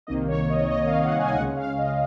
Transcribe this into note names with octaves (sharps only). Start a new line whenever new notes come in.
C2 C3 D#3 A#3 D#5
C#5
D#5
D#5
F5
F#5
G#5
C#2 C#3 G#3 C#4 F#5
F5
D#5